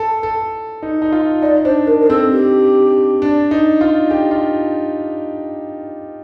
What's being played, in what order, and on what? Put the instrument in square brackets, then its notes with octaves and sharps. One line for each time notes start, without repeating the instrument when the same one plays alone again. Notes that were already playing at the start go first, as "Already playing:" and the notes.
Already playing: [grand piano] A4
A4
D#4
D#4
F4
[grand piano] D#4 [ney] D5
[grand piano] D4 [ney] C5
[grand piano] D4 [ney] A#4
[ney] A#4
[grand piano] C4 [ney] A4
[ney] G4
[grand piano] D4
D#4
F4
G4
F4